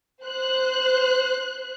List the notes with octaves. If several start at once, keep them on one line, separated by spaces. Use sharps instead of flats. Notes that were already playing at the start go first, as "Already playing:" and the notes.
C5 F#6